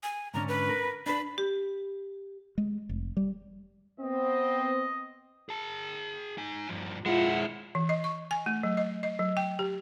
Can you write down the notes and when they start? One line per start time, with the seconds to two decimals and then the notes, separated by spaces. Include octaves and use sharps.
0.03 G#5
0.34 G#2 D3 C#4 A#5
0.48 B4
0.69 A#4
1.06 D4 B4 B5
1.38 G4
2.58 G#3
2.89 F1
3.17 G3
4.00 B3 C4 D#5
5.49 G#4 A5
6.38 D#4 G#5
6.69 G2 F3
7.06 G#3 E4 F4 F#5
7.75 E3
7.89 D#5
8.04 C#6
8.31 G#5
8.46 A3
8.63 F#3
8.77 D#5
9.03 D#5
9.19 F#3
9.37 G5
9.59 G4